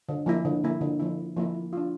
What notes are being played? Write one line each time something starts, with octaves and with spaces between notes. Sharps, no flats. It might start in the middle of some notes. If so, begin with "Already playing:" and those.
D3
F3 A#3 E4
D3
F3 A#3 E4
D3
F3 A#3 E4
D3
F3 A#3 E4
A#3
D4 F4